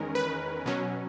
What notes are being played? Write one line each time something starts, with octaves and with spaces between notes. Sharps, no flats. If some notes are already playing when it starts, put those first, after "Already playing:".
Already playing: E2 D#3 G#3 C#4 A#4
B4
B2 F#3 C#4